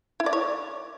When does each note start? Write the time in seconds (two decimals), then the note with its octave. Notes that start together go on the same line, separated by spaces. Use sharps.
0.20 E4
0.26 D5
0.33 C#5